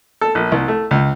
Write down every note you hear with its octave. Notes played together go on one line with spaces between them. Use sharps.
A4
A#1
C2
A3
C#2